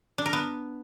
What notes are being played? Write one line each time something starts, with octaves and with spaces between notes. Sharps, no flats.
D4
A#4
B3